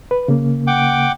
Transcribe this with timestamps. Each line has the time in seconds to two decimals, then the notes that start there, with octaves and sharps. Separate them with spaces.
0.11 B4
0.28 C#3 A#3
0.67 F#5 G5 D6